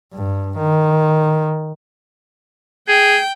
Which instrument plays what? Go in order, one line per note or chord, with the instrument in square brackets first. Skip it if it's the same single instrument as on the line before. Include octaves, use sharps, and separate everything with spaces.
[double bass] G2
D#3
[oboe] G#4 [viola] G5